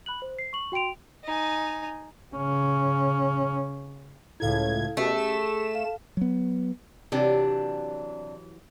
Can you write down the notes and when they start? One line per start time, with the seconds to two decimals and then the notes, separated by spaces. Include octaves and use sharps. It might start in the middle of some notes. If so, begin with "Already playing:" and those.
0.06 B5 F#6 F#7
0.22 C5
0.39 C7
0.53 C#6 F#7
0.72 F#4 G5 C6 D7 F7
1.24 D#4 G#5
2.35 C#3 C#4
4.40 C#2 A2 E4 A4 F5 G#6
4.97 B2 A3 C#4 G4 G#4
5.15 G#4 E5 E7
5.75 F5
6.17 F#3 B3
7.12 C3 E3 F#3 D4 G4 D5